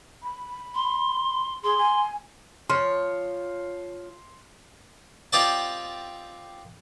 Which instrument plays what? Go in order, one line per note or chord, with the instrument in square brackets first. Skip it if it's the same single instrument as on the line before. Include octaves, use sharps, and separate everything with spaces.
[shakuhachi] B5
[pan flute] C6
[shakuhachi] G#4 [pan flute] C6
[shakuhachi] G#5
[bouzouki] F3 C#5 [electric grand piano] C6
[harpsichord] C4 F4 G4 D5 D#5 A5